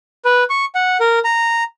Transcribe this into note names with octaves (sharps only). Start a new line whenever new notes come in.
B4
C#6
F#5
A#4
A#5